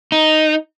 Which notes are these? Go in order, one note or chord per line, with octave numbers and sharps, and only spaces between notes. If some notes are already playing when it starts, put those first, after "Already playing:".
D#4